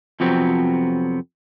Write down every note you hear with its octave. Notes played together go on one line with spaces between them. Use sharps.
F2 C3 F3 F#3 B3 C4